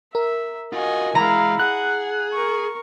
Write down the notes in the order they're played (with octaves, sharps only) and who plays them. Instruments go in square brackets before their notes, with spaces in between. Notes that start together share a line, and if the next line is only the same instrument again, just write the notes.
[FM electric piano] A#4 [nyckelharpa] E5
[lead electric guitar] F4 F#4 [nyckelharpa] D#5 G#5
[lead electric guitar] E3 G#3 [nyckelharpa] E4 F5 [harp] A#5
[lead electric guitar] G#4 [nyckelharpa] F#5 [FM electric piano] F#6
[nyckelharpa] A#4 C#6